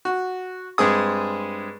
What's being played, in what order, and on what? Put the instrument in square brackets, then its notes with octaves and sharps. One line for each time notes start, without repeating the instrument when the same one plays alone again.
[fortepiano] F#4
G2 G#3 C4 G#4 D#6